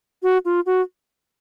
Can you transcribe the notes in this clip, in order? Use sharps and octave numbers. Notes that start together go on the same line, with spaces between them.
F#4
F4
F#4